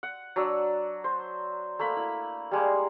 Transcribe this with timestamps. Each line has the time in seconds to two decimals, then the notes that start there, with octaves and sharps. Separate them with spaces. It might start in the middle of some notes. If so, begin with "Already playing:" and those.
0.03 F#5
0.36 F#3 D4 E6
1.04 C5
1.79 A3 A#3 B5
1.97 E4
2.51 G3 G#3 A#3